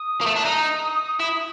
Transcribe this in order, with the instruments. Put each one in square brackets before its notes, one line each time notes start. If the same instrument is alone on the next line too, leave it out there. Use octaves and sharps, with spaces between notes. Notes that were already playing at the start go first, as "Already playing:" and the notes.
Already playing: [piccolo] D#6
[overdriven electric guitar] A#3
A3
D4
[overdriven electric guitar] D#4 [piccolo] D#6
[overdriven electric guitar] E4